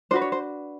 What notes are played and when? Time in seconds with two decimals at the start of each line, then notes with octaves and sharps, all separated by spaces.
0.11 D4 F#4 B4 C5
0.21 C#5
0.32 C5